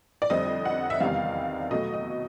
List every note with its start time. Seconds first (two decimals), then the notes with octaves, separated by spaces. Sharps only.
0.22 D5
0.30 F2 D3 G3 C4 D#5
0.65 F#5
0.90 E5
1.00 E2 C3 D#3 G3 F5
1.71 B2 F#3 A3 D#5
1.94 D#5